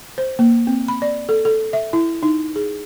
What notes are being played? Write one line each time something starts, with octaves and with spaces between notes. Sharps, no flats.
C5
A#3
C4
B5
D5
A4
A4
E5
E4
D#4
G#4